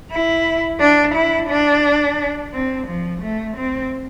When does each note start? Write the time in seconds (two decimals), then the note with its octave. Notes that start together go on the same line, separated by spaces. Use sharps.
0.12 E4
0.81 D4
1.15 E4
1.50 D4
2.53 C4
2.88 F3
3.22 A3
3.57 C4